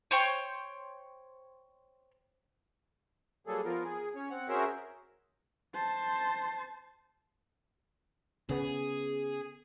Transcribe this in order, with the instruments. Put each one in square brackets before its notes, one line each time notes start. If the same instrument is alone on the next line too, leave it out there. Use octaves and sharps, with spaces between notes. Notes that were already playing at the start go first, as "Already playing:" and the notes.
[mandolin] C5 C#5 G5
[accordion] F#3 G3 A#3 G#4 A4
F3 B3 F4 A#4
G#4
C#4 C#5
C4 F#5
C#4 F#4 G#4 A#4 C5 E5
[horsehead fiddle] C5 A5
[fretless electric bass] C#3 B3 [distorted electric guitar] G#4